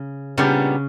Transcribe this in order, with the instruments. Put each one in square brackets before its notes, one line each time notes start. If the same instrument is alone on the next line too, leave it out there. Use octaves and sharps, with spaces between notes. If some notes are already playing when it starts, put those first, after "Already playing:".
Already playing: [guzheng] C#3
[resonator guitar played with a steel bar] A#2 G3 B3 D4 [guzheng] C#3